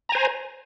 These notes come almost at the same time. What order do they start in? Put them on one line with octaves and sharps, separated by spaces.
A#5 G#5 C5